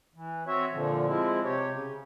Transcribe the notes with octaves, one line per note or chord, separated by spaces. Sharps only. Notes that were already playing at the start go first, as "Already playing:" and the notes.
E3
C4 F#4 C#5 E5
A#2 D3 F3
F3 G#3 C4 E4
C3 G4 C#5
C#3